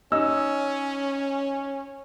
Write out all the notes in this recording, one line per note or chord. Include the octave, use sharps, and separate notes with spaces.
C#4 D#4 E6